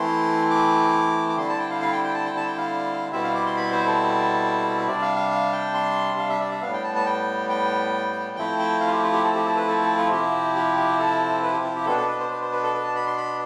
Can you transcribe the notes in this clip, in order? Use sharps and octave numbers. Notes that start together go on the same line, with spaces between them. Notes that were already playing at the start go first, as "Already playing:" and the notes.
Already playing: E3 A3 C4 E4 C6
D6
D6
D3 G3 C4 E4 C6
A5
G5
F5
F5
G5
G5
A5
G5
A5
G5
F5
B2 G3 C4 E4 E5
F5
D6
C6
B5
C5
A4
C3 G3 D4 D5
F5
F5
F5
G5
C6
F5
E5
D5
E5
A2 G3 B3 F5
G5
A5
A5
G5
G5
F3 A3 C4 E4 G5
G5
F5
F4
G4
F4
G4
A4
G4
A4
B4
A4
A4
F4
C3 F3 C4 E4 G4
G4
G4
A4
B4
G4
F4
G4
B2 B3 D4 A4
A4
B4
C5
B4
C5
B4
A4
B4
A5
B5
C6
B5